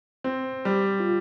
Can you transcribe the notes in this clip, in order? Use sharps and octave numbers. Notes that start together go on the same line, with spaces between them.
C4
G3
F4